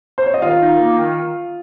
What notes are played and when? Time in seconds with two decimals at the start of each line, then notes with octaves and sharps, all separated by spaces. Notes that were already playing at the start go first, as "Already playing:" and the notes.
0.18 C5
0.26 C#5
0.34 D#5
0.41 D#3 F4 F5
0.60 D#4
0.79 A#3
0.98 D#3